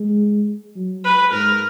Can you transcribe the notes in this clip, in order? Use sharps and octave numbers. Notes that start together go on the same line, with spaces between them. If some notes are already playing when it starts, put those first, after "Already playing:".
Already playing: G#3
F#3
B4
G#2 A#4